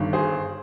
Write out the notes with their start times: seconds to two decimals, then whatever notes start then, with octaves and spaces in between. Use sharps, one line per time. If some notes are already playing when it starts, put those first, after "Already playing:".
Already playing: G1 G2 D#3
0.13 G#4 C5